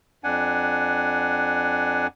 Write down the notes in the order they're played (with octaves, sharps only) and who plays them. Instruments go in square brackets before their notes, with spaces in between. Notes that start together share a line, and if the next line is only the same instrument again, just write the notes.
[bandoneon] F2 D4 F#5 G#5